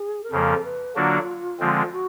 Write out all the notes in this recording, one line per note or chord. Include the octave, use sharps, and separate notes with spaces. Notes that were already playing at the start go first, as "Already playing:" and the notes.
Already playing: G#4
A#4
F2 C#3 F3 A#3 A4
B4
D3 F#3 A#3 D4 F4 F#4
D3 F3 G#3 C4
F#4